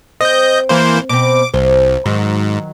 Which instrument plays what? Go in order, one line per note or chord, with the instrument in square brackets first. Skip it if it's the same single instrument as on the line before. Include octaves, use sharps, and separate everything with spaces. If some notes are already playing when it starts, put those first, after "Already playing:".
[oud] C4 [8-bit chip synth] D#5 G6
[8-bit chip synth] E3 A#3 C5
[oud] B2 C4 [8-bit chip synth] D6
[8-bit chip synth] C2 [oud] C5
[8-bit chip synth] G#2 [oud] D#3 F#3